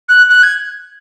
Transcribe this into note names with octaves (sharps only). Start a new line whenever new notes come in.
F#6
F#6
G#6